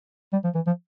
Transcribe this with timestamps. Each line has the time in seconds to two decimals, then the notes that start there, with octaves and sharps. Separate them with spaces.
0.33 G3
0.44 F3
0.55 E3
0.67 F3